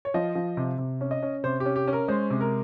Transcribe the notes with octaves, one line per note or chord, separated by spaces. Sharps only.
C#5
F3 D#5
F3
C3
C3
C#4
D#5
C#4
C3 C5
G4
C#4
G4
C#4
A#4
G#3 C5
C3
A#4